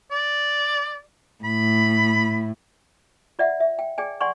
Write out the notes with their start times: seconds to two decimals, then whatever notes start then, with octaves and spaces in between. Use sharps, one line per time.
0.11 D5
1.44 A2 B5
3.39 F4 D5 E5 F#5
3.60 E5
3.79 G5
3.98 G#4 D5 G5 G#5
4.21 D5 F#5 G#5 C6 C#6